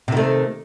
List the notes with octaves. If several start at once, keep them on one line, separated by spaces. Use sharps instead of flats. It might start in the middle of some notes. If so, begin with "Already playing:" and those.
C3 D#3 A3